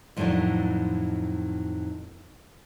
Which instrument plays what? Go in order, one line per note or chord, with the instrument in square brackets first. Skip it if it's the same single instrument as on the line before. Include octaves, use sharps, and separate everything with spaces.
[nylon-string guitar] F2 A2 D#3 F#3 D4 E4